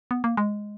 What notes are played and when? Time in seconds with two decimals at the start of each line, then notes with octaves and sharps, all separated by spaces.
0.11 B3
0.24 A#3
0.37 G#3